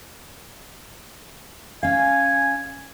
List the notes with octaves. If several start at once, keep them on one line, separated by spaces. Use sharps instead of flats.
C#4 F5 G#5